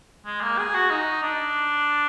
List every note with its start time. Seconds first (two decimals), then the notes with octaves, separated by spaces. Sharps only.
0.26 G#3
0.42 A#3
0.58 G#4
0.74 F#4
0.90 D#4
1.23 D4